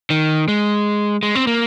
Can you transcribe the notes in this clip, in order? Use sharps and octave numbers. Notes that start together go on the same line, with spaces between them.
D#3
G#3
G#3
C4
A#3